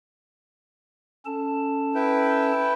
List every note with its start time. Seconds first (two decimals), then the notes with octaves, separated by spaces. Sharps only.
1.26 C#4 A4 A5
1.95 E4 B4 G5